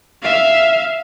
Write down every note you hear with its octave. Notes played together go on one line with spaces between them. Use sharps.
E5 F5